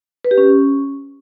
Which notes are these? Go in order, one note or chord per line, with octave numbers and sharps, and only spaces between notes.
B4
G4
C#4